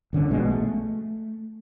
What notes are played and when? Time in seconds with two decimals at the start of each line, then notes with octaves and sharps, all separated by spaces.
0.13 G1 D3 D#3 C#4
0.29 A#1 B2 G#3
0.48 A3